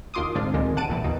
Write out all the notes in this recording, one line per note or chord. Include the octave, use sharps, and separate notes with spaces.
D#2 D#3 F4 C6 D6 D#6
G#2 D3 G#3 C4 D4 F4
D2 A#2 D#3 G3 G#3 C4
A#1 F#5 A5 D7 D#7
A#1 A#2 E3 G3
D#2 B2 D#4